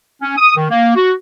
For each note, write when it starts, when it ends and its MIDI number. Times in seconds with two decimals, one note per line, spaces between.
0.22 0.34 61
0.37 0.56 87
0.56 0.69 51
0.70 0.95 58
0.96 1.11 66